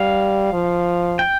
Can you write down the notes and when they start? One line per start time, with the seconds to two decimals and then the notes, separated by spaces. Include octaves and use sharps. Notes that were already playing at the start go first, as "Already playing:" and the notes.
Already playing: G3 F5
0.53 F3
1.19 G5